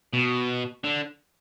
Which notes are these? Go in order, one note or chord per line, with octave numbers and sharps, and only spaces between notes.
B2
D3